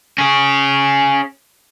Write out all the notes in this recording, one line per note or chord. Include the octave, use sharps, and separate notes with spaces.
C#4 G#4